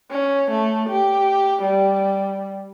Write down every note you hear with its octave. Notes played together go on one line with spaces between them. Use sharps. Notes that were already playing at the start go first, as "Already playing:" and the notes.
C#4
A3
G4
G3